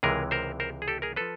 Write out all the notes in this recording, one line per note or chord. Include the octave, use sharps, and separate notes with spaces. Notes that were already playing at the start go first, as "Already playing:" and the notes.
C#2 C3 E3 G#3 G#4 A#4
A#4 C5
A#4 C5
G#4
G4 A4
G#4 A#4
F3 A4 B4